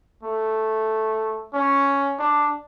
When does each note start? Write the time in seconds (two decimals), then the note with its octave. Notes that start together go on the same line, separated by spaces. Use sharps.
0.23 A3
1.54 C#4
2.19 D4